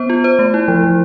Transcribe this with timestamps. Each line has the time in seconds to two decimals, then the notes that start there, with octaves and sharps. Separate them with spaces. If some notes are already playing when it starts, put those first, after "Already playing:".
Already playing: B3 C5
0.10 F4
0.24 C5
0.39 A3
0.54 E4
0.68 F3
0.84 F3